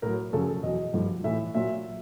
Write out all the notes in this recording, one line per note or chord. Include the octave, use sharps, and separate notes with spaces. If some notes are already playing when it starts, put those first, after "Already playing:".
A2 F#3 A#4
F#2 C#3 F3 A4
A4
E2 B2 F#3 D#5
G2 D3 F3
A2 E3 E5
A#2 F#3 E5